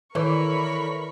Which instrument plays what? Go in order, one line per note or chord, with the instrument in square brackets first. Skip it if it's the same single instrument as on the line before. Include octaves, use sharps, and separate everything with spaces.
[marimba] D#3 [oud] E3 [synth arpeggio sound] A4 C#5 D5 [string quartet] A#4 B5 C#6